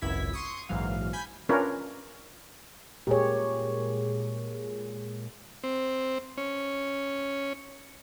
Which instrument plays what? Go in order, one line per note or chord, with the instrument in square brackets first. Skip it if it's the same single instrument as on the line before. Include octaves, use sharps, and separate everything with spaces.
[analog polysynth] G#1 C#2 F#2 E4 G#6 B6
C6 C#6 D#6
A#1 G#2 E3 F#3 F5
G#5 B5 G6
[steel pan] C#4 D4 F4 A#4 B4 C#5
[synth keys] A#2 G#3 [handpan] G4 C#5 [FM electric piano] G#4 A#4
[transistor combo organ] C4
C#4